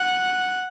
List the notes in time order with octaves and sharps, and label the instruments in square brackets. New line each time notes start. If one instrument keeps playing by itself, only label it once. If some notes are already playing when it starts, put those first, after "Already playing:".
Already playing: [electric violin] F#5